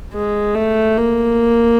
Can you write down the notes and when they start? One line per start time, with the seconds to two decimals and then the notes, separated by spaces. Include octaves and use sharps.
0.13 G#3
0.55 A3
0.98 A#3